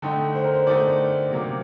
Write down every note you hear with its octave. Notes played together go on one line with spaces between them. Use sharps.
D3 A3 D#4 G5
C5
A#4
C5
D3 A3 D#4 D5
C3 F#3 A#3